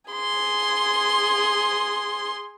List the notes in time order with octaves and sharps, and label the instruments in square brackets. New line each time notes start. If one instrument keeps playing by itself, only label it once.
[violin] G#4 C6